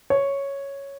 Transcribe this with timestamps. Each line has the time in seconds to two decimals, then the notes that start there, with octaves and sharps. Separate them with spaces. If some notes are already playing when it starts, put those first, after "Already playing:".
0.10 C#5